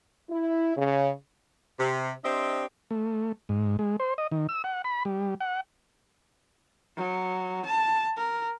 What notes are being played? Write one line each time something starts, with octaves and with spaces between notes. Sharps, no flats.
E4
C#3
C3
C4 D4 G4 C5 D#5 E5
A3
G#2
G#3
C5
D#5
D#3
E6
F#5
B5
G3
F#5
F#3
A5
A#4